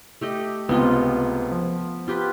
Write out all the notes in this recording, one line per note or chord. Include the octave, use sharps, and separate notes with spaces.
A3 G4 D#5
C#2 C3 B3 F4 D#5
F3
F4 G4 B4